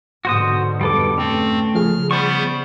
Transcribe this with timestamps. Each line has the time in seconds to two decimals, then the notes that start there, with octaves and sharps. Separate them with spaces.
0.25 G#2 B2 D3 F#4 C5 D#6
0.81 F2 G3 A4 B4 D6
1.18 A3 C4 C#4
1.75 C#3 F3 G#4 F6
2.11 G3 B3 C5 C#6